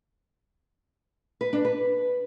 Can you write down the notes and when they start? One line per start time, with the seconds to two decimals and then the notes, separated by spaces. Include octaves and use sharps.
1.41 B4
1.53 D4
1.65 B4